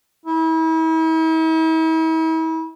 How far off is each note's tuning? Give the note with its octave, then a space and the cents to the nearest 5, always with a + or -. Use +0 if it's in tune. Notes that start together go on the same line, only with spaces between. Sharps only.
E4 -40